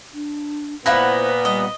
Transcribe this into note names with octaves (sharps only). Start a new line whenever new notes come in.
D4
A#2 B3 E4 C5 F5 F#5 B5 A#6
G3 D#5